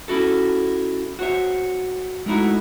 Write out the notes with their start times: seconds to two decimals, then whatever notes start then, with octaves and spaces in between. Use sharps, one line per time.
0.08 C#4 E4 F#4 A4
1.19 F#4 C5 C#5 E5
2.26 G#3 A3 D#4 E4 F#4